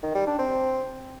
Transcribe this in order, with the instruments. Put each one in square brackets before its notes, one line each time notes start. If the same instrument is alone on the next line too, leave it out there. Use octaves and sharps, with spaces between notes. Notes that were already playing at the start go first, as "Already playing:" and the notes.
[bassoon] D#3
G3
D4
C4